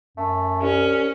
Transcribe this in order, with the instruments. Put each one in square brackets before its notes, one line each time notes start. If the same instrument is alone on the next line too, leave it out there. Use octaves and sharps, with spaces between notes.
[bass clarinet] F#2 [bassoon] A3
[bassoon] C2 [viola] C#4